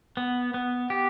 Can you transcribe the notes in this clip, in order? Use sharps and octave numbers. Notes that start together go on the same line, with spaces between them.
B3
B3
G4